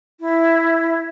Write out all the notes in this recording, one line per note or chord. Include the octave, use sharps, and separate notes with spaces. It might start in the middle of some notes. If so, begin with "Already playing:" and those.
E4